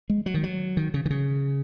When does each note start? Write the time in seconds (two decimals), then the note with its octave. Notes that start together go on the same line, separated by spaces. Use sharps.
0.10 G#3
0.26 F#3
0.34 D#3
0.43 F#3
0.77 D#3
0.94 C#3
1.06 D#3
1.10 C#3